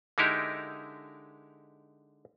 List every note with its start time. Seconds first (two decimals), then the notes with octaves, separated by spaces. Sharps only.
0.18 D3 G#3 D#4 E4 G4 A#4